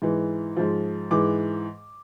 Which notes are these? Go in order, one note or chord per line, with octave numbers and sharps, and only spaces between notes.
G#2 E3
G#2 F3
G#2 E3 D6